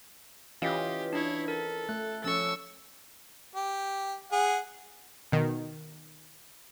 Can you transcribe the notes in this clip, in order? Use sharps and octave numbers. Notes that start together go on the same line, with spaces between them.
E3 C#4 F4 G4 D#5 F5
D4 E4 C#5
A4 A#4
A3 F#6
F3 C#4 A4 C#6 E6
G4
G#4 F#5
B2 D#3